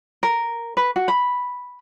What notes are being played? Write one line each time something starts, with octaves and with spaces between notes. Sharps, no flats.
A#4
B4
F#4
B5